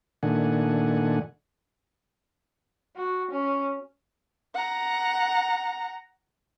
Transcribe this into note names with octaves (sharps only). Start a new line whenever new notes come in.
A#2 D#3 A3 D4 F#5 G#5
F#4
C#4
F#5 A#5